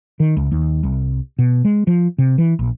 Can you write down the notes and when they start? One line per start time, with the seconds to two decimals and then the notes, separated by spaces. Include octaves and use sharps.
0.20 D#3
0.37 C#2
0.52 D#2
0.83 C2
1.39 B2
1.65 G#3
1.87 F3
2.19 C3
2.38 E3
2.59 A#1